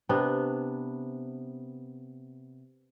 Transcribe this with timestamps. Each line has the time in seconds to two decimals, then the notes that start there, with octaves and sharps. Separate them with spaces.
0.09 C3 B3 D4